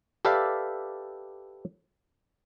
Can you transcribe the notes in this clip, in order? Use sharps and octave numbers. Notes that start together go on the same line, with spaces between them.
G4 A4 B4 D5 E5 F5